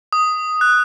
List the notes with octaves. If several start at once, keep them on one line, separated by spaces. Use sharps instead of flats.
D#6
F#6